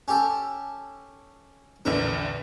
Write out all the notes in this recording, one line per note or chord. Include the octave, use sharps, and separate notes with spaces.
C#4 G4 A4
A#1 E2 D3 A#4